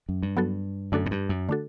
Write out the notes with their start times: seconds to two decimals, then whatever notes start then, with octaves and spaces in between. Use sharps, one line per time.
0.09 F#2
0.23 G2
0.37 F#3 B3 F#4 A4
0.92 F#2 D3 A3 D4 F#4 A4
1.06 A2
1.11 G2
1.29 F#2
1.49 D3 A3 D4 F#4 A4